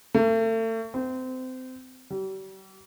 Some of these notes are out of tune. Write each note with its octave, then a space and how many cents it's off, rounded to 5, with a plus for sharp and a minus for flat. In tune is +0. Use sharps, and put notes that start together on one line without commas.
A3 +40
C4 -25
G3 -40